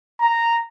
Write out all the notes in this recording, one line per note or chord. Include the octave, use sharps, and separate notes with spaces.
A#5